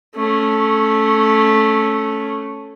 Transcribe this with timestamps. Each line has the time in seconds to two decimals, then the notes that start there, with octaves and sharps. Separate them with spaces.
0.15 A3 C#4